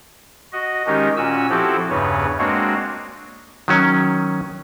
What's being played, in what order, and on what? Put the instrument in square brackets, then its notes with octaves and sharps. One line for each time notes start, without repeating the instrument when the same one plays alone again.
[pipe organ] F#4 D#5
D#3 G#3 C#4 D#4 G4 A#4
A#2 C#4 F#4 G#5 E6
F3 C4 E4 F#4 G4 A4
E2 G2 C#3 B4 C#5
G#3 A#3 C4 D4 F#4 C#5
[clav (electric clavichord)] D#3 F#3 C#4